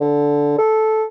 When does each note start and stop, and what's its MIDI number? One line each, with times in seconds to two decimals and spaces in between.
0.01 0.57 50
0.58 1.05 69